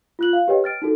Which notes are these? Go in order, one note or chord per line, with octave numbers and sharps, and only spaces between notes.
F4 F#6 F#7
F5
G4 B4 C#5 D#5 G5
F6 A6 D7
D#4 F#4 A4